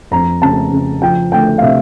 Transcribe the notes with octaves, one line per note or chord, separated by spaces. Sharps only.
F2 A#5
C#3 A5
C#3
F3 G5
D2 G5
F5
C3 E5